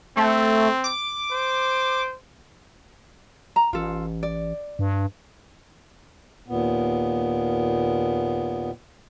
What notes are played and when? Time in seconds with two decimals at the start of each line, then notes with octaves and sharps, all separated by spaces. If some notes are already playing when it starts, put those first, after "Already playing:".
0.17 A3 C4
0.84 D6
1.31 C5
3.56 A#5
3.73 A1 F4 A4
4.23 D5
4.79 G2
6.48 D#2 A#2 B3